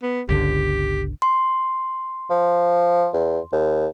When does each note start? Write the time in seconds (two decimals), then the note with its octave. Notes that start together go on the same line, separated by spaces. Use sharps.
0.02 B3
0.29 G1 C#2 D3 G4
1.22 C6
2.30 F3
3.13 E2
3.52 D#2